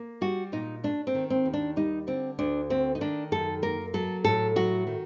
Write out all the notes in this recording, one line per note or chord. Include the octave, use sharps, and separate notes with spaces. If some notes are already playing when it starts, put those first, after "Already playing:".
Already playing: A#3
G3 F#4
A#2 D#4
A3 D4
C4
D#3
C4
D#2
D4
G3 D#4
D3 C4
D2 D4
A3 C4
D#4
D#3 D4
F#2 A4
A#3 A#4
F#3 A4
A2 A4
F#3 F#4
D#3